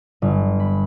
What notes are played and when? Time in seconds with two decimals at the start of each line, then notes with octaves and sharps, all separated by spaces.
0.22 G1
0.60 B5